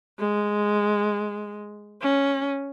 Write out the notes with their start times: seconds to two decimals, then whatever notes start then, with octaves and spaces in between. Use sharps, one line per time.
0.19 G#3
2.02 C#4